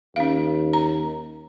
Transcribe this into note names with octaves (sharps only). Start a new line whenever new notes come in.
D#2 C#4 F5
A#5